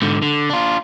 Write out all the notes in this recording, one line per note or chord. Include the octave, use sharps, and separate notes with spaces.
G#2 D3
D3
D4 F4